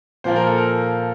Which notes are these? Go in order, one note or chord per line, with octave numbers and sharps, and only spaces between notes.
A#2 F3 A#3 C5
A#4
A4
A#4